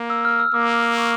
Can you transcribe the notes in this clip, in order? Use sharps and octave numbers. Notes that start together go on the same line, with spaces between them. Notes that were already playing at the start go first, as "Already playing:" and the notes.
Already playing: A#3
E6
F6
E6
A#3 D6
C#6